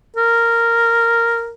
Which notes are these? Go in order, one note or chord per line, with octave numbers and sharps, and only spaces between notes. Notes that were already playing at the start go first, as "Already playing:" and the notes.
A#4